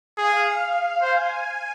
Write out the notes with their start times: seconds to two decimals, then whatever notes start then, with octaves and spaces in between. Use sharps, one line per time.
0.17 G#4 F5
0.60 F5
1.02 C5 G#5